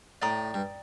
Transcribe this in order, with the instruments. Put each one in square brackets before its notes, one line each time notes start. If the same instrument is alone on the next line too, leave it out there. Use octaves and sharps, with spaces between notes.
[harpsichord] A2 [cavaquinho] D5 G5 A#5 D#6
[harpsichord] G2